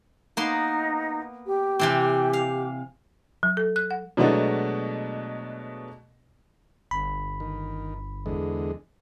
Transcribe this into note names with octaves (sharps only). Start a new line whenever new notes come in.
A#3 B3 D#4 C6
G4
C3 E3 C4
F5
F#3
A4
F#6
F#5
B2 F#3 G#3 A3 B3 D4
G1 B5
D#3
E2 D3 G#3